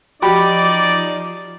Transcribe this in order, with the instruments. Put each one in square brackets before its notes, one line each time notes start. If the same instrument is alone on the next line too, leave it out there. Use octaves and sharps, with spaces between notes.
[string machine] F3 [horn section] D#4 D5 [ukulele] F#4 G4 B5